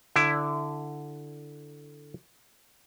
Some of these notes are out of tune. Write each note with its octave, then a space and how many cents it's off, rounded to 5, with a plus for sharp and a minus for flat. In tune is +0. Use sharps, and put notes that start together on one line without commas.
D3 +0 E4 +10 D5 +0